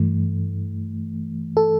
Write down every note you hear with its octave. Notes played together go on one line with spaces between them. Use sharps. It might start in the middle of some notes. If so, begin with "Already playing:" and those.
Already playing: G2 E3 A3
A4